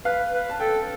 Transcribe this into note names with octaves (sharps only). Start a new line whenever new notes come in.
B4 F5
B4
A5
A4 G5